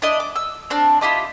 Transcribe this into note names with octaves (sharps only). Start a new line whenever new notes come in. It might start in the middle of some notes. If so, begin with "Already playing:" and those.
D4 E4 D5 D#5
D6
E6
C4 D4 F6
E4 F4 G4 D#5